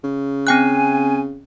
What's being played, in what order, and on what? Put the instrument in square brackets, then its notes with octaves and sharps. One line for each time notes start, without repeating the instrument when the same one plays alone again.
[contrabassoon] C#3
[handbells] C4 G5 F#6 [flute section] G#5